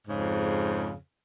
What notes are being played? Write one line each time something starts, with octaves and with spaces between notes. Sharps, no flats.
F2 G#2 C#3